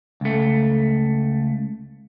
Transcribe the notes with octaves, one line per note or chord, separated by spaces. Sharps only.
C#2 A3